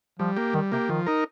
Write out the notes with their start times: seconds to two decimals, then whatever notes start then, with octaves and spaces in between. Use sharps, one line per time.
0.19 F3 G3
0.36 A#3 G4
0.54 D#3 G3
0.72 C3 A#3 G4
0.89 D#3 F3
1.07 D#4 A#4